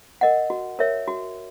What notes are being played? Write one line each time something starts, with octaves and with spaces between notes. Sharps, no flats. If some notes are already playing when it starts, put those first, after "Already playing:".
A#4 D#5 F#5
F#4
A#4 C#5 E5
F#4